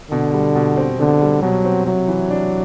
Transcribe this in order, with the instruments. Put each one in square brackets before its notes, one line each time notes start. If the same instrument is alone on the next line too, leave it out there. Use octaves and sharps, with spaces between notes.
[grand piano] B2 [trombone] D3
[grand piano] G3
B2
C4
[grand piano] B2 [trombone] D3
[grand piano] G3
[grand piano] B2 [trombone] F#3
[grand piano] C4
[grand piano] C3 [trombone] F#3
[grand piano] E3
D4